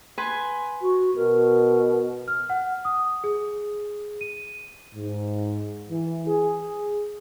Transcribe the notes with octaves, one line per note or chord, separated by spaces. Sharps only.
B4 G#5 C6
F#4
B2 A#4
F6
F#5
D#6
G#4
D#7
G#2
E3
G#4